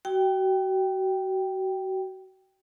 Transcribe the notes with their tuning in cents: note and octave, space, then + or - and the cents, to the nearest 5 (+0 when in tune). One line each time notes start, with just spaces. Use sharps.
F#4 +30 G5 -5